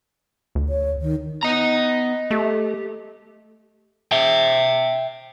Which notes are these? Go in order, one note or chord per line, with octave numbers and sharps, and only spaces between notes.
D2
C#5
D#3
B3 D#5 A#5
A3 G4
E5 G5